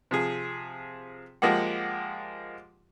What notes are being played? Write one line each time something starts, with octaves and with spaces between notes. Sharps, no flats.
C3 F3 G#4
F3 G#3 A#3 G4 F#5